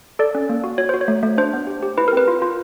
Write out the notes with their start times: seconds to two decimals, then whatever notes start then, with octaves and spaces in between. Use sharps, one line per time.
0.19 A4 D5
0.35 C#4
0.49 A#3
0.64 F#4
0.78 F#4 C#5
0.89 F#4 C5
1.01 C#5
1.08 A3
1.23 A3
1.38 D4 C5
1.53 B3
1.67 G4
1.83 G4
1.98 E4 B4
2.08 A#4
2.13 C4 B4
2.28 F4
2.42 F4